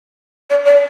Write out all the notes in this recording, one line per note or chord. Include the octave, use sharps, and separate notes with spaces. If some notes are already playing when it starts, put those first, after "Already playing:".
D5
D5